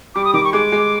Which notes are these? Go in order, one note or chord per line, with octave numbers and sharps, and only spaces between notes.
G3 D6
D#6
D#3 D6
C#6
G#3 D6
G#3